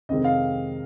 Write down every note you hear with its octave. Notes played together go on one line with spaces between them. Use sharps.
F2 C3 D#3 G#3 C4 D#5
F5